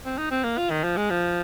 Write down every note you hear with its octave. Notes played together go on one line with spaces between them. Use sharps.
C4
D#4
C4
A#3
F4
D#3
F3
G#3
F3